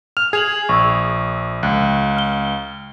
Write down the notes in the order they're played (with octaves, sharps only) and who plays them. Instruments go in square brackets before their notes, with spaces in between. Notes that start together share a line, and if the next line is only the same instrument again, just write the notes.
[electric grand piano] F6 [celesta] F7
[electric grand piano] G#4 [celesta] G#6 F7 F#7
[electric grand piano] A#1 [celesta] C#6 D#6 E6
[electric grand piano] C#2 [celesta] F#6
[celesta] F6 G7